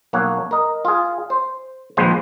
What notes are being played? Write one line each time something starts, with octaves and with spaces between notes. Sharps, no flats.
B1 A#3 C#5 F#5
A#4 D#5
F4 G#4
C5
A#1 D#2 F3 G#3 B4 C5